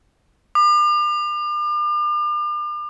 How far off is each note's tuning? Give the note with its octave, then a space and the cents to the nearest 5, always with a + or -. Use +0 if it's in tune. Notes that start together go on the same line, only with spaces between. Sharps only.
D6 +40